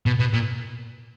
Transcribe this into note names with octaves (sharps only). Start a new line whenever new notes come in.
B2
B2
A#2